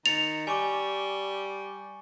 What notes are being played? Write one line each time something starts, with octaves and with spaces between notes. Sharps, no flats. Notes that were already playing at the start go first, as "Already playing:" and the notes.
D#3 A6 C#7 F7
G3 G#5 C#6 D6